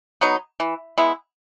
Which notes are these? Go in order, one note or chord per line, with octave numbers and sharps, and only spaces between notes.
F#3 B3 D#4
E3
G#3 B3 E4